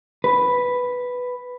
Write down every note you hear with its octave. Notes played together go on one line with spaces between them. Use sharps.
B4